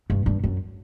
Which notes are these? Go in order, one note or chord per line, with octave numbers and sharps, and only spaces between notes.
G2
G2
F#2